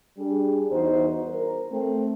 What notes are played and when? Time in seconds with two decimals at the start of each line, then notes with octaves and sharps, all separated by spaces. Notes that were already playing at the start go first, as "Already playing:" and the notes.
0.18 G3 D4 G#4
0.71 E2 D#4 F#4 C5
1.29 A#4
1.72 A3 C4